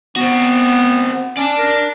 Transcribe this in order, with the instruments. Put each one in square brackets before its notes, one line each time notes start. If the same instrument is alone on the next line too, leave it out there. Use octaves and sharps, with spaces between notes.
[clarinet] B3 [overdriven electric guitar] C4 F#4
[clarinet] C#4 [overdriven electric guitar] D5 A5
[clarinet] A#4